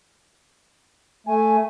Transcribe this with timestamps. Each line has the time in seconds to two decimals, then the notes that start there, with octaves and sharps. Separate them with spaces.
1.27 A3 G#5